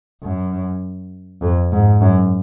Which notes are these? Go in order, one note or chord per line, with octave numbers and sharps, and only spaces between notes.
F#2
F2
G#2
F#2